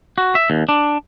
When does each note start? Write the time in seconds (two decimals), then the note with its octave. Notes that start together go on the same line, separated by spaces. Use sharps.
0.18 F#4
0.35 E5
0.50 D#2
0.69 D4